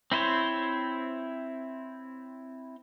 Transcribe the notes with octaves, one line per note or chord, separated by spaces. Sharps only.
C4 E4 C5 C#5